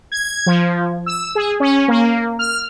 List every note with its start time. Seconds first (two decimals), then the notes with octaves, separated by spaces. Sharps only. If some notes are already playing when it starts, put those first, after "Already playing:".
0.12 G#6
0.46 F3
1.06 E6
1.35 G#4
1.60 C#4
1.88 A#3
2.39 F6